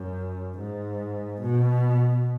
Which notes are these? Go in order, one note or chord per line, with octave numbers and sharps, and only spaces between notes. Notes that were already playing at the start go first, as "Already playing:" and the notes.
Already playing: F#2
G#2
B2